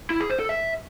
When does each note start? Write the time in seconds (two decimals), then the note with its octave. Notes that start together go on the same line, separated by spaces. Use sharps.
0.10 E4
0.20 G#4
0.30 C5
0.39 A4
0.49 E5